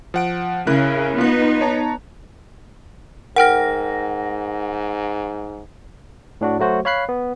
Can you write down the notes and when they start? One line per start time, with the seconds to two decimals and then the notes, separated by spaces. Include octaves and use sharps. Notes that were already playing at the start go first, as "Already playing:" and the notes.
0.14 F3 F#5 D7
0.67 C#3 E4 A#4 F#6
1.18 B3 D#4 F4 F#6
1.61 C#5 A5 A#5
3.36 G#2 A#4 F#5 G5 F6 A#6
6.41 A2 D4 F#4
6.59 F#3 A3 F#4 C5
6.85 C#5 F5 B5 F#6 C7
7.09 B3